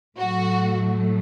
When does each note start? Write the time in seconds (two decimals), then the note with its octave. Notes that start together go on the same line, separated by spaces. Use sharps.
0.18 A2 F#3 A3 F#4